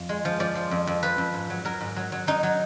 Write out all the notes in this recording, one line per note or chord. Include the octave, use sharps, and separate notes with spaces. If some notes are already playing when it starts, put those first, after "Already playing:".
Already playing: F2
G#3
F3
F3 D5
F3
F2
F2
F3 B4
F2
G#2
F#3
F#3 A#4
G#2
F#3
F#3
F#3 D#4
F#3